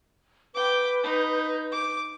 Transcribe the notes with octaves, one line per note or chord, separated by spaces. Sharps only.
B4 G5 D6 G6
D#4
D6